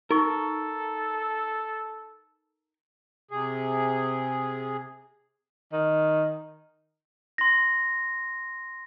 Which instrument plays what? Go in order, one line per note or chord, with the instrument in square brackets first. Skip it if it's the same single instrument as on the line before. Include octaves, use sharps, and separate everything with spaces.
[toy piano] D#4 C#6 [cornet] A4 [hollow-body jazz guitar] A#4
[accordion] C3 G#4
[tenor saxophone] D#3
[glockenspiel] C6 A#6